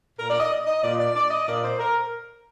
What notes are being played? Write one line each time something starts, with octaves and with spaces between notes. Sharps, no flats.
A#2 A#4
D5
D#5
D#5
A#2 D5
D5
D5
D#5
A#2 D5
C5
A#4